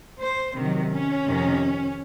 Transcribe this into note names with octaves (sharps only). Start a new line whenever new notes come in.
C5
C3 D#3 F#3
C#4
F2 C3 D#3